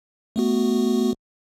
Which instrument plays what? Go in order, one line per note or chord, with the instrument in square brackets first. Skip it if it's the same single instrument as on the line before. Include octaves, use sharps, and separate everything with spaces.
[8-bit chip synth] A3 B3 F#4